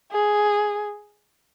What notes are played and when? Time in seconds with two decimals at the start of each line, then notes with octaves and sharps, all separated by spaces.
0.12 G#4